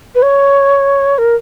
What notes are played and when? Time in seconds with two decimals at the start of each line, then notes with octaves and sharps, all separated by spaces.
0.15 B4
0.22 C#5
1.18 A#4